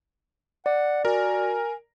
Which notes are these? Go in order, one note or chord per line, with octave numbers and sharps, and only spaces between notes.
D5 F#5
F#4 A#4 G#5